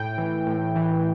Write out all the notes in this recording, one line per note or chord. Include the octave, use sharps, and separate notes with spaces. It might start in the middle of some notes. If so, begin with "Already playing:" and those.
Already playing: A2 G5
E3
A2
E3